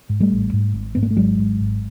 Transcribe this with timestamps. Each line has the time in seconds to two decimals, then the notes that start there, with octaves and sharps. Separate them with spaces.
0.09 G#2
0.20 G3 A3
0.31 A1
0.53 G#2
0.74 G#1
0.95 G#2 B3
1.03 A#3
1.11 A3
1.17 G#1 F#3 G#3
1.38 G#2
1.60 G#1